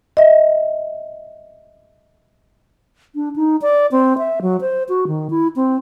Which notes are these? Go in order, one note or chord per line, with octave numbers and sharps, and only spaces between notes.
D#5 E5
D4
D#4
D5
C4
E5
F#3
C5
F#4
D#3
E4
C4